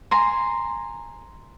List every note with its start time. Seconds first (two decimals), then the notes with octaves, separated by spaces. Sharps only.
0.11 G#5 A#5 C6